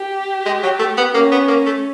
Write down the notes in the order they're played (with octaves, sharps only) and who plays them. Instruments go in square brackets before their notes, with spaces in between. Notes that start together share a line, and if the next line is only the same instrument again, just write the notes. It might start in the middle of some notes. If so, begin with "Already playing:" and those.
Already playing: [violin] G4
[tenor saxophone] G#3
F#3
A3
B3
[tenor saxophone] A#3 [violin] C#4
[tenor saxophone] B3
A#3
A3